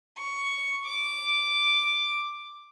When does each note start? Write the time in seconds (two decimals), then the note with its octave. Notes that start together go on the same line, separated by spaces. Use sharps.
0.17 C#6
0.85 D6